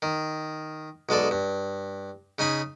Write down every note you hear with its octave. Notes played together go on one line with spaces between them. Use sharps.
D#3
B1 G#3 A4 D5
G2
C#3 D#4 G#5 B5